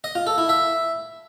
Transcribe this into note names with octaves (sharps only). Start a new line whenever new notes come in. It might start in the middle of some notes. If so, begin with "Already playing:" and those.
D#5
F4
A4
E4
E5